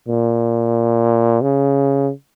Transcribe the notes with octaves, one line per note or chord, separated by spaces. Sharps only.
A#2
C#3